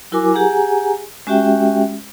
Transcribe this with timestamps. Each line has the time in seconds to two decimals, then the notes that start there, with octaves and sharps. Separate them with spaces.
0.12 F#3 E4 F#4 A#4 G#5 D6
0.34 G4 G#4 F#5 G#5 A#5
1.27 G#3 C#4 F#4 G4 E5 G5